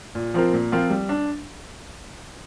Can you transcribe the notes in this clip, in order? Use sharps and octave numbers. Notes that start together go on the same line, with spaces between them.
A#2
F3 C4 F4 A#4
A#2
F3 C4 F4 A#4
G3
D4